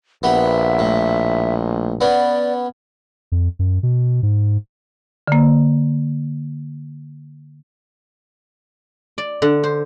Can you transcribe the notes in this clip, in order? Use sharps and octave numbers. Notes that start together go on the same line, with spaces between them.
A#1 B3 G4 E5
A2
B3 C#4 D5
F2
F#2
B2
G#2
D3 A#3
D5
D3
C5